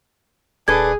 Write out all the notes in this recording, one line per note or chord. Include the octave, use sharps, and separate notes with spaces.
D#1 D4 G#4 A4 B4 G#6